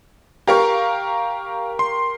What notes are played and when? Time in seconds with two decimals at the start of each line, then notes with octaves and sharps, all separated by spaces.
0.48 G4 A#4 F5 A#5 C#6
1.79 C6